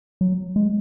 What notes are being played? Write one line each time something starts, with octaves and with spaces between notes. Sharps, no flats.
F#3
G#3